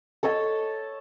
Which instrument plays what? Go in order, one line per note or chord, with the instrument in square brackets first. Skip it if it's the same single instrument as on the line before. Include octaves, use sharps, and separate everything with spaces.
[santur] A4 C#5 D#5 A5